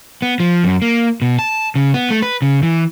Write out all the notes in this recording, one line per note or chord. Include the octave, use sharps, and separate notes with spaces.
B3
F3
F#2
A#3
B2
A5
C#3
B3
A3
B4
C#3
E3